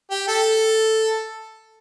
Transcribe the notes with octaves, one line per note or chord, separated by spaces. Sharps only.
G4
A4